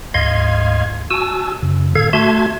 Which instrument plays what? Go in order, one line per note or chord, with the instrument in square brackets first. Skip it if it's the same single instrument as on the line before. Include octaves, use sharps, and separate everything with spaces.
[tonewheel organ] D2 G#2 D#5 F5 C6 G#6
F#4 G#5 A5 E6
F#2 C#3
A2 D3 A4 F5 G#6
A3 F#4 E5 A5 C6 G#6